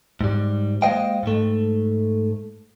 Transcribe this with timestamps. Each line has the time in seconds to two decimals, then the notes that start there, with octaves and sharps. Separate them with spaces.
0.21 G#2 G3
0.82 G#3 A#3 C5 D#5 F5 G5
1.23 G#2 A3